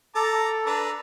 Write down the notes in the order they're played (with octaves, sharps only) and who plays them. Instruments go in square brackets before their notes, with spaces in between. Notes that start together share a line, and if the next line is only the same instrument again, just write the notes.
[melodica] A4 [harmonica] A5 A#5 D6
[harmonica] D4 B4 A#5